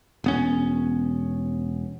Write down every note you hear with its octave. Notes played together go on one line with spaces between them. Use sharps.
E1 B3 C#4